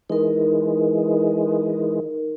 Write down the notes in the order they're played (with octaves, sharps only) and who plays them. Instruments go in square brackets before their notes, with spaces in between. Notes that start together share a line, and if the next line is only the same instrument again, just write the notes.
[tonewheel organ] E3 G#3 [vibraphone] D#4 A#4